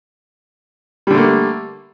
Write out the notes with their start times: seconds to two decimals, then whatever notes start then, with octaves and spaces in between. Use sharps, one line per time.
1.07 G3
1.10 D3
1.14 A3
1.17 A#3